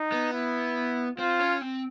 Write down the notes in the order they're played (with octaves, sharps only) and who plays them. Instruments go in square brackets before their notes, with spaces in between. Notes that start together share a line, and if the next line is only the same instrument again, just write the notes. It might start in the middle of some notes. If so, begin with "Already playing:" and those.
Already playing: [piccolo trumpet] D#4
[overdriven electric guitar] B3
[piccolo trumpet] E4
[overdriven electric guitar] C4 [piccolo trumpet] F4
[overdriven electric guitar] C#4
C4